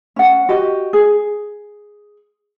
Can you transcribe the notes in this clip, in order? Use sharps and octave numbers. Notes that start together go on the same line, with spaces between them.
C#4 F#5
F#4 G4 D#5
G#4